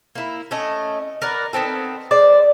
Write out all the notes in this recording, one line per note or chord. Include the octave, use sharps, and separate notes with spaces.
A#3 E4
A3 C#4 D#5
A#4 B4 D5 F#5
D#3 B3 C4 A4
G#3 C5 D5